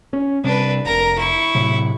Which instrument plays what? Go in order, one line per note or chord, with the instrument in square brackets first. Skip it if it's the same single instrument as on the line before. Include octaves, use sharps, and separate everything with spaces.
[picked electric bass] C#4
[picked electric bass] C3 G3 [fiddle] D4 B4
[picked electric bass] F1 [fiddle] A#4 A#5
[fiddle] E4 C#6
[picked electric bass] A2 C3 F#3